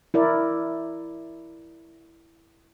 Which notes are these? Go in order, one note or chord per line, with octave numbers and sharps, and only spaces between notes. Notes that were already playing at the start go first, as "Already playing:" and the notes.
E4 A#4 D5